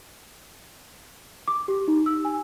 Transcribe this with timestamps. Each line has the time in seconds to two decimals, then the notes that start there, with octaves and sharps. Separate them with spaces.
1.48 D6
1.68 G4
1.88 D#4
2.06 E6
2.25 G#5